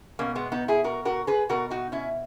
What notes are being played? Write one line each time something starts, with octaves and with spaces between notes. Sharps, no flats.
B2 A#3 C#4
G#3 B3
B3 D#4
E4 G#4
F#4 A#4
F#4 A#4
G#4 B4
B2 F#4 A#4
D#4 F#4
C#4 E4